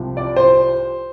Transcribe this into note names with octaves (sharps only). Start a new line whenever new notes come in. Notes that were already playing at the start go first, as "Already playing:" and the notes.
Already playing: C2 C3 F3
D5
C5